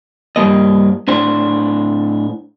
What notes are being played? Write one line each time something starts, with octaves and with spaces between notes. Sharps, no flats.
G2 G3 A#3 D#5
A2 D4 C5